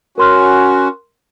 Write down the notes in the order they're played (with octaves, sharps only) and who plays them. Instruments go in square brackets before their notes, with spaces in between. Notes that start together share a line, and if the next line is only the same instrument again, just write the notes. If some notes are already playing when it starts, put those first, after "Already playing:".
[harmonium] C#4 F#4 [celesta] A#4 C6 F6